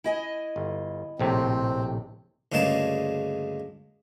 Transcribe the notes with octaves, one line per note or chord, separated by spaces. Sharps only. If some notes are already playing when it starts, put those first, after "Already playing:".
E4 D#5 G#5
G1
A#1 A2 C3 C4
D2 G2 C#3 G#3 A#3 A5